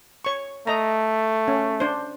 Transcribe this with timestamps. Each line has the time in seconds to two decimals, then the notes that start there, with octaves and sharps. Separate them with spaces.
0.25 C#5 C#6
0.67 A3 D#5 A#5
1.48 C#4
1.80 D4 C5